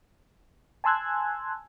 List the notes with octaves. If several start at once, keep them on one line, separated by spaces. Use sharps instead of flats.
G#5 A5 C6 E6 F#6 G#6